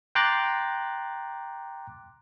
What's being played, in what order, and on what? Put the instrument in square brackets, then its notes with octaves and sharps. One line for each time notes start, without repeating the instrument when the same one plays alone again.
[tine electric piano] G5 A#5 C6 D6 F#6 A6